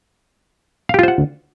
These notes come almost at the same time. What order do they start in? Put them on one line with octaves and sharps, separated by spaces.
F5 G4 F4 C5 F#5